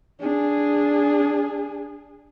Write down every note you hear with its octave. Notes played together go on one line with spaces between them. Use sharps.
D4 G#4